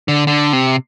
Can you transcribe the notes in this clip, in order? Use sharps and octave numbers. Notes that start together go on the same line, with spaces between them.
D3
D3
C3